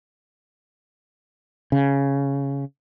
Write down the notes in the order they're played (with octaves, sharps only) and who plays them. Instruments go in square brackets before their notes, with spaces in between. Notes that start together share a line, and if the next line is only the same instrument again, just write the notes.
[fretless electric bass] C#3